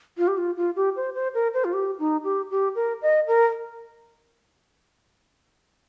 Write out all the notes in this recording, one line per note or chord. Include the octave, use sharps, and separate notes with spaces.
F4
G4
F4
F4
G4
C5
C5
A#4
C5
F4
G4
D#4
G4
G4
A#4
D#5
A#4